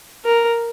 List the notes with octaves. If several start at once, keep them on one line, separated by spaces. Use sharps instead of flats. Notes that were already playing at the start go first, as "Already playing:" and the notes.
A#4